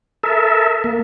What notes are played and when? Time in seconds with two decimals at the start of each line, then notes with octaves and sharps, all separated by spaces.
0.23 A4 A#4 E5
0.84 A#3